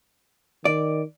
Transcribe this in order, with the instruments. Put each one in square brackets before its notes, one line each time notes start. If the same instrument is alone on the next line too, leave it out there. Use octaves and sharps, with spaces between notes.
[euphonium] D#3 [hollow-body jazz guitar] D5